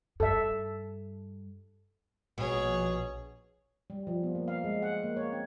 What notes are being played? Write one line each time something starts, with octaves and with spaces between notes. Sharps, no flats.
G2 A4 E5
A#1 B2 G#4 C#5
G3
F3
B3
A#3
F5
G#3
F#5
A#3
C#5
C4